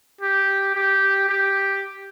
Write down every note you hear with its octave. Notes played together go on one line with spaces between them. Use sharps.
G4
G4
G4